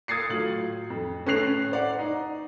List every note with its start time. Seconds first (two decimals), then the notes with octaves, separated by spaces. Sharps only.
0.08 D#6 G#6 A6 C7 C#7
0.29 A2 F#3 F4 F#7
0.90 F2
1.26 A2 C#4 A4 F#6 C7 F7
1.71 C5 D5 F#5
1.99 D#4 D5